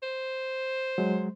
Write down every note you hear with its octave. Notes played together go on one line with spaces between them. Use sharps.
C5
F#3 G#3